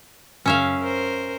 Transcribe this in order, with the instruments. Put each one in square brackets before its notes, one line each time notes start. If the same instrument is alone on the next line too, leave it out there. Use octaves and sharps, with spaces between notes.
[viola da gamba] F#2 C#3 [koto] C#4 E5 F5
[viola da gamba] A#4 C5